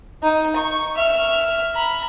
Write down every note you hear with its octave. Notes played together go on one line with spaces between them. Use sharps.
D#4
C#6
E5 F6
A#5 B5